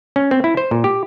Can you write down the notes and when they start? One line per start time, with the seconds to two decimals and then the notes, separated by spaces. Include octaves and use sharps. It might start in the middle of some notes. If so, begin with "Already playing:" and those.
0.16 C#4
0.31 C4
0.44 E4
0.57 C5
0.71 A#2
0.84 G4